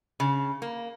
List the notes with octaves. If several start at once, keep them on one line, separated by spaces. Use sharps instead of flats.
C#3
A#3